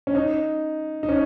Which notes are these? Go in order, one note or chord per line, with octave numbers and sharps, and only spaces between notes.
C#4
D#4
D#4
C#4